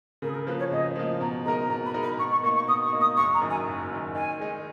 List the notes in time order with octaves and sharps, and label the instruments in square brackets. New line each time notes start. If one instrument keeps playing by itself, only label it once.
[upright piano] C#3 [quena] A#4
[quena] G#4
A#4
[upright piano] F3 A#3 [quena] B4
[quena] C#5
[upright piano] C#3 [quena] D#5
[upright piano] F3 A#3
[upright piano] B2 [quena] A#5
[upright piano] G#3 D#4 A#4 D#5 [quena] A#5
[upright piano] B2 [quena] A#5
[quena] B5
[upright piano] G#3 D#4 A#4 D#5
[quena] B5
[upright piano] B2 [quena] C#6
[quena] C#6
[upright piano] A#3 [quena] C#6
[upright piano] D#4
[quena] C#6
[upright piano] B2 [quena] D#6
[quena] C#6
[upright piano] A#3 D#4
[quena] D#6
[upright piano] F#1 [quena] C#6
[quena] A#5
[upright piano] F#2 D#3
[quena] G#5
[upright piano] F#1
F#2 D#3
[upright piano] D#3 [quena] G#5
[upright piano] G#3 D#4